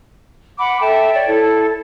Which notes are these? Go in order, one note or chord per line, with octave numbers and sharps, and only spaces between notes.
F#5 B5 D6
A4 E5 G5 A5
C#5 D5 G5
E4 A4